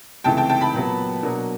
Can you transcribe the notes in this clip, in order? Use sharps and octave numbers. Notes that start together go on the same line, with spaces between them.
C#2 C3 E3 A3 G5 A5
G5 A5
G5 A5
A5 B5
A#2 F#3 B3
B2 F#3 A#3 D4